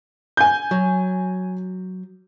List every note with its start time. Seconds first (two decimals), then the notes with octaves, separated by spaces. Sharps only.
0.37 G#5 G6
0.71 F#3